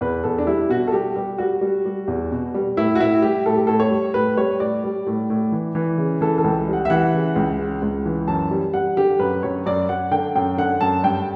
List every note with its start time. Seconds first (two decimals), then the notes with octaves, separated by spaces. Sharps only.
0.01 E2 B4
0.24 E2 A4
0.38 D4
0.47 G3 E4
0.69 B2 F#4
0.87 A4
0.92 G3 G4
1.16 G3 G4
1.38 G3 F#4
1.61 G3
1.86 G3
2.08 E2
2.31 B2
2.54 G3
2.77 A2 E4
2.95 F#4
3.00 A2 E4
3.22 G3 G4
3.46 A2 A4
3.56 G4
3.67 A2 A4
3.80 C#5
3.91 G3
4.14 A2 B4
4.37 G3 C#5
4.60 A2 D5
4.84 G3
5.07 A2
5.30 A2
5.52 E3
5.75 E3
5.98 C#3
6.21 E3 A4
6.38 A4
6.44 C#2
6.68 G3
6.73 F#5
6.85 E5
6.90 E3 F#5
7.13 C#3
7.36 C#2
7.59 C#3
7.82 C#2
8.06 E3
8.28 F#2 A5
8.51 G3
8.74 G3 F#5
8.97 D3 G4
9.19 F#2 B4
9.43 F#2 C#5
9.66 F#2 D5
9.89 F#2 F#5
10.11 D3 G5
10.36 F#2 G5
10.58 D3 F#5
10.81 F#2 A5
11.03 G2 G5